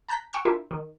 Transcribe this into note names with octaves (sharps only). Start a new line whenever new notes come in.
A5 A#5 F#6 G6 A#6 B6
F#5 G5 C#6 E6 F6 G6
D4 E4 F4 A#4 E5 G5
D#3